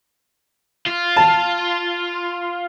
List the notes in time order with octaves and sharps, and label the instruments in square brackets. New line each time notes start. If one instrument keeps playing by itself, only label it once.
[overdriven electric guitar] F4
[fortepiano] A5